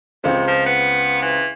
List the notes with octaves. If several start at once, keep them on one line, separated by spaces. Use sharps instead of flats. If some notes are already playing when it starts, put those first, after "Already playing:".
C#2 C3 C4
F3
B3
E3